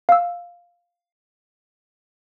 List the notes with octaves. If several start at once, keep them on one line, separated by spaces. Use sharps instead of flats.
F5 E6